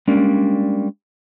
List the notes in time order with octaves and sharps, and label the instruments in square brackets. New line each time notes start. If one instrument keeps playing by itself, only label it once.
[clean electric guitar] G3 G#3 A#3 C#4 D4